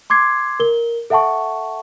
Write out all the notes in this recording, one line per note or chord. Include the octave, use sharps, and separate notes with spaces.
C6 D6 G#6 C7
A#4 G7
A4 E5 F#5 A5 C#6